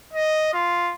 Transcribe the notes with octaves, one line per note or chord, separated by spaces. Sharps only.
D#5
F4